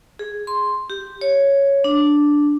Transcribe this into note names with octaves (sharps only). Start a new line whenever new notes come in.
G#4
C6
G4
C#5
D4